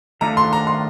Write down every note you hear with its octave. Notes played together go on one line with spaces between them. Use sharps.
D#3 A3 D4 F4 A4 A#5
C6
A#5
C6